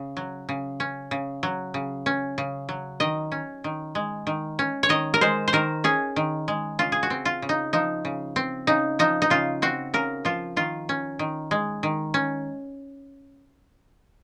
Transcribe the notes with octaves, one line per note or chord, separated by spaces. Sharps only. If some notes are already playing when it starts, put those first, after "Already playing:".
Already playing: C#3
F#3
C#3
C#4
C#3
F#3
C#3
C#4
C#3
F#3
D#3 D#5
C#4
D#3
G#3
D#3
C#4
C#5
D#3 D#5
A#4
G#3 C5
C5
D#3 A#4
C#4 G#4
D#3
G#3
C#3 F4
G#4
F#4
C4
F4
C#3
D#4
F3 D#4
C#3
C4
C#3 D#4
F3 D#4
D#4
C#3 F4
C4 F#4
C#3 A#4
F3 F4
D#3 F4
C#4
D#3
G#3
D#3
C#4